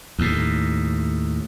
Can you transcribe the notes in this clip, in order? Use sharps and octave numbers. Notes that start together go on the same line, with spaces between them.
D#2 A2